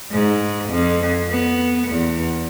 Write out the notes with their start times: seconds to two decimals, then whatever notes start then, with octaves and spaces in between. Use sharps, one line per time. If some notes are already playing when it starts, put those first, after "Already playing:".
0.11 G#2
0.69 F2
1.29 B3
1.88 E2